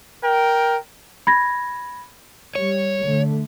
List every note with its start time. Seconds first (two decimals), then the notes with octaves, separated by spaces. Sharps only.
0.23 A#4 G5
1.27 B5 G#6 A#6
2.55 G3 C#5
3.04 D3 A3